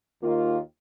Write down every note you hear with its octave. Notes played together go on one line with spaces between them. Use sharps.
D#2 D#3 A#3 F4